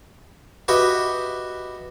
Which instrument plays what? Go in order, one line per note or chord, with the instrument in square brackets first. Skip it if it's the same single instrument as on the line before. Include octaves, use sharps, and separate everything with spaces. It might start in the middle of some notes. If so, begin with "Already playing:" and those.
[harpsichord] F#4 G4 B4 D#5 E5